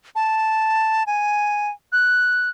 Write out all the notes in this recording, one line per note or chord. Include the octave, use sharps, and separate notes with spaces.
A5
G#5
F#6